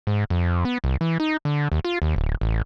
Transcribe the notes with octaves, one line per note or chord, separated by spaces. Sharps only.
G#2
F2
B3
C2
E3
D#4
D3
D#2
F4
D#2
D1
A1